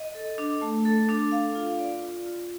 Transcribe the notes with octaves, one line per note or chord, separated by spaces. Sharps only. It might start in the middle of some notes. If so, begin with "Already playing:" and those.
Already playing: D#5
A4
D4
A3
A4
D4
F5
F4
D5
F4
F4